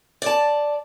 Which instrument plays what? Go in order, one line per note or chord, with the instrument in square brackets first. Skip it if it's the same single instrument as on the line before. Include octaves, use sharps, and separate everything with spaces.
[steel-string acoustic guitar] D5 A5